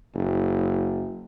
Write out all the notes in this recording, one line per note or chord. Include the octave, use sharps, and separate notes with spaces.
F#1